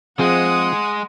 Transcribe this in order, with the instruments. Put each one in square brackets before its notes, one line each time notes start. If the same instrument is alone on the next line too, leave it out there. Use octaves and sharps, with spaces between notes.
[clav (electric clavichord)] F3 C4 G#4 [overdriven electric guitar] G#3 [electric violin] F#5 D#6